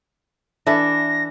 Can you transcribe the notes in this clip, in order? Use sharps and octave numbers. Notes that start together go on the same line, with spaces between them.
E3 D4 A4 A#6